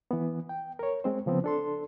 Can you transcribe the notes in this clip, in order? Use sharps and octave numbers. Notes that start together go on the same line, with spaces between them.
E3 B3
G5
A#4 C#5
G#3 C4 C5
C#3 F3 B3 C4
D4 A4 C6